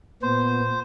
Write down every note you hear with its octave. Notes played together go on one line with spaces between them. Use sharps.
A#2 B3 C5